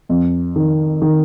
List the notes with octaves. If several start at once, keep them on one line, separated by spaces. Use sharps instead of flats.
F2
D#3
D#3